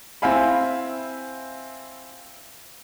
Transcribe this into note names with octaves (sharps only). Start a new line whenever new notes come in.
C4 E4 E5 F5 G#5 B5